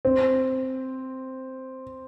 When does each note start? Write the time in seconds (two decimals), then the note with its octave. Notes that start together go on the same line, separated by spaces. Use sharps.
0.05 C4